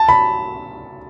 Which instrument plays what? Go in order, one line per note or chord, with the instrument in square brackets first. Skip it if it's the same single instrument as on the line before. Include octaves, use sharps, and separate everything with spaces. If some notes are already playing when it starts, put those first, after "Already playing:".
Already playing: [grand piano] A5
B5